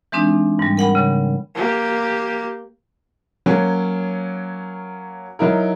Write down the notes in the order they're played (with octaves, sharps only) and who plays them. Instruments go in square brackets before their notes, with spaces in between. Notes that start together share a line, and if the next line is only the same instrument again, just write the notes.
[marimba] E3 G#3 C4 D4 D#4
G#2 G3
A#4 F#5 G5 B5
C#3
[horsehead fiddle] A#3 G4
[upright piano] F#3 A#3 C#4
F#3 D#4 E4 A#4